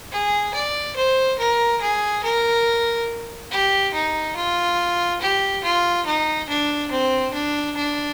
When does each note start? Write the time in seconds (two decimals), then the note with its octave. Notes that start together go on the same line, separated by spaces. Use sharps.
0.12 G#4
0.54 D5
0.96 C5
1.39 A#4
1.81 G#4
2.24 A#4
3.51 G4
3.94 D#4
4.37 F4
5.21 G4
5.64 F4
6.06 D#4
6.49 D4
6.91 C4
7.34 D4
7.77 D4